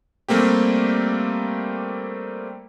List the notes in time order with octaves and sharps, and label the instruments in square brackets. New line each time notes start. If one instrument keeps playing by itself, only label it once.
[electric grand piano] G3 A3 A#3 C4 G4